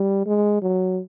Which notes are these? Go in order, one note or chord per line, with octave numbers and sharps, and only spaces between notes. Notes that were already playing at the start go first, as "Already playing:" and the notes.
Already playing: G3
G#3
F#3